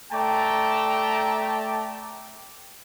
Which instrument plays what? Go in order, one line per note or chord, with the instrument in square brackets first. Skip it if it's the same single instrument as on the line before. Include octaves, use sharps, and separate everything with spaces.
[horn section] A3 D5 E5 G5 A5 A#5